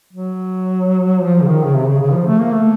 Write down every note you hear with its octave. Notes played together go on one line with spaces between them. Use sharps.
F#3
F3
C#3
D#3
C#3
C3
C#3
C#3
F3
A3
A#3
A3